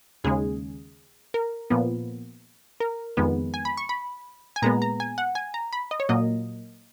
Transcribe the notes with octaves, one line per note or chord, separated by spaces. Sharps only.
D#2 C#3 G#3 G#4
A#4
A#2 F3 B3
A#4
F2 D#3 G#3 B3
G#5
B5
C#6
B5
G#5
A#2 G#3 B3 A#5
A#5
G#5
F#5
G#5
A#5
B5
D#5
C#5
A#2 F#3 A#3 D#5